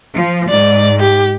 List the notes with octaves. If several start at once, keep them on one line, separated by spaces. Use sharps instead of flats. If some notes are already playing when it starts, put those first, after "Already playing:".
F3
G#2 D5
G4